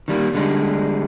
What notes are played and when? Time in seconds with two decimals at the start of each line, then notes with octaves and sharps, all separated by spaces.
0.08 D#3 G3 A#3
0.34 D3 G3 G#3